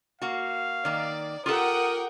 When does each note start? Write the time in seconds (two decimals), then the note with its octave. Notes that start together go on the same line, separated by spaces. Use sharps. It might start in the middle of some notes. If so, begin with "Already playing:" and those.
0.22 A#3 F#4 F5
0.85 D#3 A#3 D5
1.46 F4 G4 A4 A#4 F#5 G5 D#6